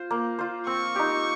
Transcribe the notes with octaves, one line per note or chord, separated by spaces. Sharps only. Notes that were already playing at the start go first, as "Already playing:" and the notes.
Already playing: F4 C5
A#3
F4 C5
C4 C#6
D#4 G4